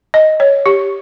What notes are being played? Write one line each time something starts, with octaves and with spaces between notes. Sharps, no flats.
D#5
C#5
G4